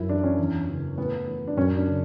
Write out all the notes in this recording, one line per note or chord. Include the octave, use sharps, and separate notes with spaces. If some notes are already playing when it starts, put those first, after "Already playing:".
Already playing: F#2 E4
E3 D4
C#4
E2
C#3 E3
A2 B3
E3
D4
F#2 C#4
D4
C#3